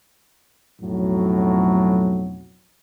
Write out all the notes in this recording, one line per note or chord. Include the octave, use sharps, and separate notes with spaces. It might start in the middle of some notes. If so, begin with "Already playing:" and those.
B1 F2 A2 F#3